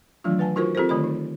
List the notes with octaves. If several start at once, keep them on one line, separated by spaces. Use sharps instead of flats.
D#3 E3 F#3 A3 D4 F4
B4 F#5 G#5 A5
D#4 F4 F#4 A#4 C5 C#6
C4 F4 G4 A4 A#4 C5
D3 D#3 A3 F4 D#5 B5
D#4